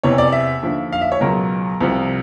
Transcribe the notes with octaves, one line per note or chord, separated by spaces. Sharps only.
E2 C3 E3 C#5
D5
E5
D#2 D3 F3
F5
E5
C#5
C#2 B2 F#3 A#4
C2 C3 F3